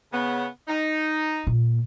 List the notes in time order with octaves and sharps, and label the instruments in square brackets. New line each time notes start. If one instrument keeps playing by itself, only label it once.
[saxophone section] C#3 B3
D#4
[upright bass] A#2